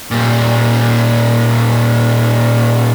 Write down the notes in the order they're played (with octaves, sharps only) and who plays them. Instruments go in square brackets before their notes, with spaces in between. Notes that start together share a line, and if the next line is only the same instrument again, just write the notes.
[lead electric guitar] A#2 G3